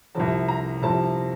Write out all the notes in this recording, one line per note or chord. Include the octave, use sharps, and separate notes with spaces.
C2 C3 F3 A5
A#5
C2 C3 F3 A5